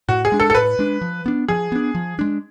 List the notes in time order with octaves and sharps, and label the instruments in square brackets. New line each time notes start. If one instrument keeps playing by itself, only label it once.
[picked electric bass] A2 [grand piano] F#4
[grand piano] G#4
[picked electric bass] G#3 D4
[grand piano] A4
A4
[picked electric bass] A2 [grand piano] B4
[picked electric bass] G#3 D4
F3
B3 D4
[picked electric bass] F3 [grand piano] G#4
[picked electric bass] B3 D4
F3
G#3 D4